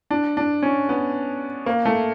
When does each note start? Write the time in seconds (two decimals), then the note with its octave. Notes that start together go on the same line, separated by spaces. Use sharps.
0.11 D4
0.37 D4
0.62 C#4
0.89 B3
1.66 A#3
1.85 A3